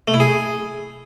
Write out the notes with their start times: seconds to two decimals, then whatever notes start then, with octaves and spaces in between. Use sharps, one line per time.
0.08 A3
0.14 E4
0.20 G#4